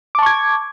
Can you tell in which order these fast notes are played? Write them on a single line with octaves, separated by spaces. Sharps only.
D6 A5 C#6 G#6